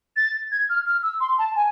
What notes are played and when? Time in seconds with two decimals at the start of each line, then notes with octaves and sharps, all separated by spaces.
0.16 A6
0.52 G#6
0.69 F6
0.86 F6
1.03 E6
1.20 C6
1.38 A5
1.56 G#5